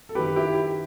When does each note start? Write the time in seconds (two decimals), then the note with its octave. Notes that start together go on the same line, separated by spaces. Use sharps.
0.09 A4
0.15 F#2 D#3 G4 B4
0.36 E4 G4